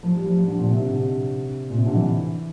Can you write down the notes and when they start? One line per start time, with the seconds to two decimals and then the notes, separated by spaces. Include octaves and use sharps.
0.03 F3
0.14 G3
0.25 F3
0.36 F3
0.47 D3
0.58 A#2
0.70 C3
0.80 D3
0.92 C3
1.70 A#2
1.78 C3
1.86 D3
1.94 E3